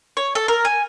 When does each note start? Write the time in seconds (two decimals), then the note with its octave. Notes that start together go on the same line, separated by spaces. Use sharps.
0.17 C#5
0.35 A4
0.48 A#4
0.65 G#5